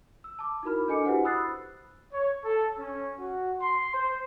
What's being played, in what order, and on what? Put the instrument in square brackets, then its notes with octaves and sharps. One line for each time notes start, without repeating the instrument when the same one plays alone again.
[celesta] E6
A5 D6
D#4 E4 F#4 A#4 B5 F6
D4 A4 D#5 G#5 D6 C#7
E4 F#4 G4 B4 C5 F#5
B5 D#6 E6 F#6 A6 C7
[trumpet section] C#5
A4
C#4
F#4
C6
C5